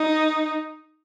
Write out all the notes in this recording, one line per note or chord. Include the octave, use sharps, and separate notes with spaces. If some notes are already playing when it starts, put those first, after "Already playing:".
Already playing: D#4